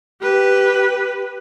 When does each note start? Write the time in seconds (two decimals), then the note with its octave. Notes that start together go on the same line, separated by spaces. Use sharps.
0.22 G4 B4